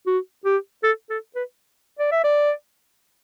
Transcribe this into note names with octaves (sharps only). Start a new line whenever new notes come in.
F#4
G4
A4
A4
B4
D5
E5
D5